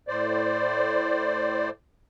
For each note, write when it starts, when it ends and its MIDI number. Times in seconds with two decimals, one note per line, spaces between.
0.08 1.70 45
0.08 1.70 72
0.08 1.70 74